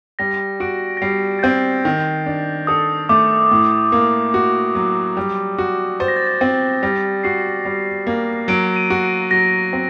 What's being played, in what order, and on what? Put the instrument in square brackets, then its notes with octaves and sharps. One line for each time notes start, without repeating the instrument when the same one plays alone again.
[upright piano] G3 [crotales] A#6
[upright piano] F#4 [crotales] D7
[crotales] A#6
[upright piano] G3 [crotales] C7
[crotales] A6
[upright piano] C4 [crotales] G6
[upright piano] D#3
D4
[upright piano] A4 [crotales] D#6
[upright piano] A3 [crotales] D6
[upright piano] A2
A#3
F#4
F#3
G3
F#4
[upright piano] C5 [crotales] A6
[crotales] A#6
A6
A6
[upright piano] C4
[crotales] A6
[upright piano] G3 [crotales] A#6
[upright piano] F#4 [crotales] C7
[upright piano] G3
A#3
[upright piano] F#3 [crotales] D7
[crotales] D#7
[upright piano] F#4
[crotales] D7
[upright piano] F#3 [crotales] A#6
[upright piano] C4